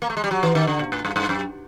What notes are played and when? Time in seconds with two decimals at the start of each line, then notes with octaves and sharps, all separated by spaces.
0.02 A#3
0.10 A3
0.17 G#3
0.24 G3
0.31 F#3
0.43 E3
0.55 D#3
0.67 D3
0.79 A#2
0.92 A2
1.05 G2
1.16 G2
1.29 F#2